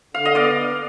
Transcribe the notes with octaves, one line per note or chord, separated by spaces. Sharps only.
D3 F5
D#5
B3 D5 F5